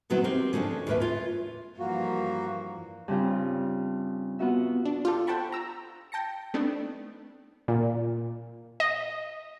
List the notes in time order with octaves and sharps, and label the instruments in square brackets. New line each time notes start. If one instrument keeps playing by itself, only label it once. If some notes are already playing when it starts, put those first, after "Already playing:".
[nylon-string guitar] B2 D#3 F#3 B3 C4 E4
C4 G4 A#4 C5
C#3 F3 A3 C4 D4
D#2 A2 A#4 B4 E5
F4 C#5
[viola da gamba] G2 E3 F3 [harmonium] A#3 F#4
[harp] G2 C#3 C4 F4
B3 F4 F#4 E5
[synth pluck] D4
F4 G4 A4
C5 F#5 G5 A5 B5 C#6
A#5 E6
G5 A5 A#6 C#7
A3 B3 C4 D4 D#4
[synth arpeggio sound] A#2
D#5